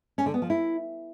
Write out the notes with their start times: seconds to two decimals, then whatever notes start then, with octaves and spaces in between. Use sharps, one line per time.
0.18 C#4
0.26 D3
0.34 B3
0.42 F3
0.50 E4